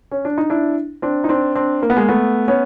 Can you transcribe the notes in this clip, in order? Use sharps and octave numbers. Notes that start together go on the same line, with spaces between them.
C#4
D4
D#4
D4 E4
C4 D4
D#4
C4 D4
C4 D4
A#3
B3
G#3 A#3
A3 B3
B3 C#4